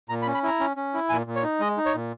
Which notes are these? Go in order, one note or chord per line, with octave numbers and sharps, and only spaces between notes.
A#2 A#5
B5
C#4
B5
E4 A#5
C#4
C#4
E4
A#2 G#5
A#2
C#5
D#4
G#3 D#5
D#4
C#5
A#2